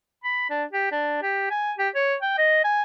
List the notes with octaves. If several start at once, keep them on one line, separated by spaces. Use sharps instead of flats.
B5
D4
G4
D4
G4
G#5
G4
C#5
G5
D#5
G#5